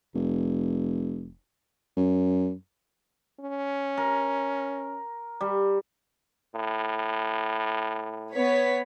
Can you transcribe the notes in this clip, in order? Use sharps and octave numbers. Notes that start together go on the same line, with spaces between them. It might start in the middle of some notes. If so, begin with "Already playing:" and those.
F1
F#2
C#4
A#4
G3
A2
B3 C#5 B6